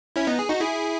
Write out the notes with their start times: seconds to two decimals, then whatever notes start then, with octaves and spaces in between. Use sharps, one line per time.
0.16 C#4 E4
0.27 B3 D#4
0.39 G#4
0.49 D#4 F#4
0.60 E4 G#4